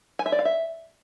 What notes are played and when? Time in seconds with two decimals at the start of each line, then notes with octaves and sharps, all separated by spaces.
0.19 G#5
0.26 E5
0.32 D5
0.39 F5
0.45 E5